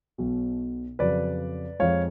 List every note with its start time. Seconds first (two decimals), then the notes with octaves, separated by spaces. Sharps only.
0.18 B1 B2 F#3
0.99 F2 C#3 F#3 B4 D5
1.79 F2 F3 G#3 C#5 F5